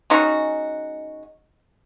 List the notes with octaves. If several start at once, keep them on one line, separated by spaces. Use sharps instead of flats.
G#3 C#4 D#4 F#4